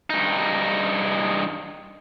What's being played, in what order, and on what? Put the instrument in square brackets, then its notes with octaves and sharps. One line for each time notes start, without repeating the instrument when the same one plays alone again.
[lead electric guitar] G2 D#4